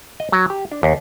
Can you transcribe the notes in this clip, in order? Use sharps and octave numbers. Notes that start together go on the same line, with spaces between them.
D#5
F#3
G4
D4
D#2